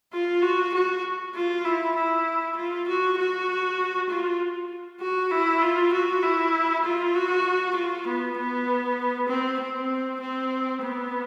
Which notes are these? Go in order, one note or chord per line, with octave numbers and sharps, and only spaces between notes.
F4
F#4
F#4
F4
E4
E4
F4
F#4
F#4
F4
F#4
E4
F4
F#4
E4
F4
F#4
F4
B3
B3
C4
C4
C4
B3